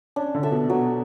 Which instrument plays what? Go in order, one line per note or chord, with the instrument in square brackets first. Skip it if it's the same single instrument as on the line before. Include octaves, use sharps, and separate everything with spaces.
[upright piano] C#4 [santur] D4
[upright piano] D3
[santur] A4 E5
[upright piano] B2
[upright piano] B2 [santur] F#3